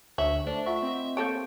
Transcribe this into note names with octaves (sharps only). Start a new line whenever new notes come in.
D2 C#5 E5 F#7
A3 D4 C5
F4 E5 F#5 C#6
C4 D#5
A#3 A4 C#5 G6 D7